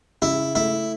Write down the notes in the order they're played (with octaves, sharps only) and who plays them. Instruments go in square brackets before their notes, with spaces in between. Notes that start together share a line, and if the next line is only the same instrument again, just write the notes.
[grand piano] C#3 [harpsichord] E4
[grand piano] A3 [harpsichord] E4